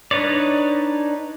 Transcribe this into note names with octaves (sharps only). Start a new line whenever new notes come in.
D4 D#4 B4 C#5 D5